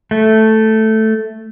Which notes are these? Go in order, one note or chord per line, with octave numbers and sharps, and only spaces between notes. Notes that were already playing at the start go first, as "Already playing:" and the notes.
A3